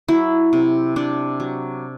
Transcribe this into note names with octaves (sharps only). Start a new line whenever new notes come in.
F#3 E4
C3
C3 D4
F#3